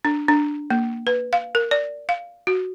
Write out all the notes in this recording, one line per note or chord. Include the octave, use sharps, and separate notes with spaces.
D4
D4
A#3
B4
F5
A#4
D5
F5
F#4